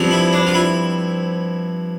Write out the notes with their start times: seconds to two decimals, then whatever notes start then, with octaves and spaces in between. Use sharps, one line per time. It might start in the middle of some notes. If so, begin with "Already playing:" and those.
Already playing: G2 F3 C4
0.11 E4
0.33 D4
0.47 F4
0.54 E4